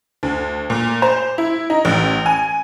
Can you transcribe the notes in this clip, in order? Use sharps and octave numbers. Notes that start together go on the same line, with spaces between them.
D2
A#2
C5
E4
D#4
A1
G#5